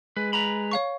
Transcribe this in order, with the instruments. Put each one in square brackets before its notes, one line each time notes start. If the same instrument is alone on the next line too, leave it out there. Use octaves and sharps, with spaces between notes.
[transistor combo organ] G#3 [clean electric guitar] B4
[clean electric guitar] B4 A#5 B5
[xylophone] C#5 F5 C#6